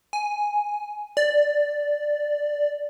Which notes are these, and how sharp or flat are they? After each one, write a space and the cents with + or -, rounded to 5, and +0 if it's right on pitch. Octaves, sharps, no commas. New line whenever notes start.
G#5 +5
D5 +0